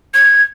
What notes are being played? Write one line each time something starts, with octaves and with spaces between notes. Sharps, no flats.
G#6